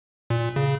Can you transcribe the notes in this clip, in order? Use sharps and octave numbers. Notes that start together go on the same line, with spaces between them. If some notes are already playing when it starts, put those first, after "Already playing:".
A#2
C#3